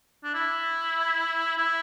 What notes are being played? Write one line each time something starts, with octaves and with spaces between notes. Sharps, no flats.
D4
E4
E4